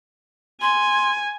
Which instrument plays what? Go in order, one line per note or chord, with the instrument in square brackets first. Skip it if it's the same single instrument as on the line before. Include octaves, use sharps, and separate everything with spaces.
[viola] G#5 [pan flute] C6